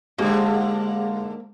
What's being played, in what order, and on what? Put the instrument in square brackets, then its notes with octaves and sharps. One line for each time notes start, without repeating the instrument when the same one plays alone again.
[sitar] G#2 D3 [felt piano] G#3 G4 [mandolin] A#3